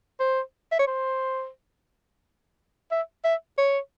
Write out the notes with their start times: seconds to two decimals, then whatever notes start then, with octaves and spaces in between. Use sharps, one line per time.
0.20 C5
0.72 E5
0.79 C#5
0.87 C5
2.91 E5
3.24 E5
3.58 C#5